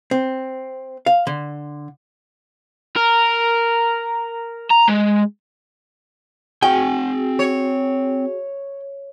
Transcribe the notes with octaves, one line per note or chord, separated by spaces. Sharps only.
C4
F5
D3
A#4
A#5
G#3
C4 F#4 G#4 G5 G#5
C#5